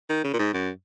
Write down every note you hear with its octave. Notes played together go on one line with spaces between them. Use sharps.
D#3
C#3
A#2
G#2
F#2